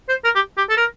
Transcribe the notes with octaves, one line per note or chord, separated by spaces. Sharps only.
C5
A#4
G4
G4
A4
A#4